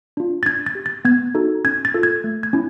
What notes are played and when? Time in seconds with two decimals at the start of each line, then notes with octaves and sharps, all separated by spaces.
0.17 D4 F4
0.43 A6
0.46 D4 G#6
0.66 A6
0.75 G4
0.86 A6
1.05 B3 G#6
1.35 D#4 F#4 A4
1.64 C#4 G#6
1.85 A6
1.94 F4 A4
2.03 G#6
2.24 A3
2.43 G#6
2.53 C#4 E4